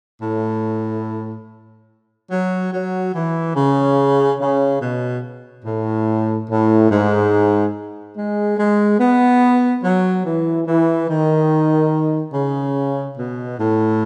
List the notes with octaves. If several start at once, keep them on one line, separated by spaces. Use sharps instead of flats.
A2
F#3
F#3
E3
C#3
C#3
B2
A2
A2
G#2
G#3
G#3
B3
F#3
E3
E3
D#3
C#3
B2
A2